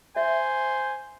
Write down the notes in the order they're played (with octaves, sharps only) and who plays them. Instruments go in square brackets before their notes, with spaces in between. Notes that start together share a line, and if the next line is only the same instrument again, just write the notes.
[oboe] C5 [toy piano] E5 [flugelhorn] G#5